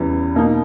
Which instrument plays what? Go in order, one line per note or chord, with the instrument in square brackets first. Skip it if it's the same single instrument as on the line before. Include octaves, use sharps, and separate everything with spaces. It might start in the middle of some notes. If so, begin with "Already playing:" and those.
Already playing: [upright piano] E2 C#3 E3 G3
B2 A#3 D#4